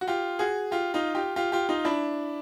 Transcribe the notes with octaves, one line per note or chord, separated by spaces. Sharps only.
F#4
F4 G4
F#4 G#4
F4 G4
D#4 F4
F4 G4
F4 G4
F4 G4
D#4 F4
D4 E4